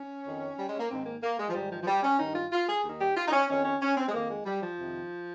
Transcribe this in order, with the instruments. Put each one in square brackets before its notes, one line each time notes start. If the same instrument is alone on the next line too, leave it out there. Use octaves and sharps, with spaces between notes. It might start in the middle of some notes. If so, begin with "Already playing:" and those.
Already playing: [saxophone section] C#4
F2 D#3
G3
G#3
A#3
G#2 D#3 C4
A#3
A#3
G#3
F3
G#2 D#3 G3
F3
F3
G3
C#4
G2 D#3 D#4
F4
F4
G#4
D#2 D#3
G4
F4
D#4
C#4
F2 D#3 C#4
C#4
C#4
C4
G#3
F2 D#3 A#3
G#3
G3
F3
F2 C3 D#3